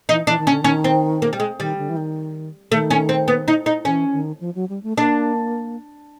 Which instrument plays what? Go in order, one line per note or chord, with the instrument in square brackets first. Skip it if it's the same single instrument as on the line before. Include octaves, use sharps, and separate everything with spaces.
[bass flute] E3 [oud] D#4
[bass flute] E3 [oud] D4
[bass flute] D#3
[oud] C#4
[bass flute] D3
[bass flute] D#3 [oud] C#4
[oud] C4
A#3
G3
G#3
[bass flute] D#3 [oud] G3
[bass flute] D3
E3
D#3
[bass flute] D#3 [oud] A3
[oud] C#4
C4
B3
D#4
D#4
[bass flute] E3 [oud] C#4
[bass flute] D#3
F3
F#3
G3
A3
[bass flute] A#3 [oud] D4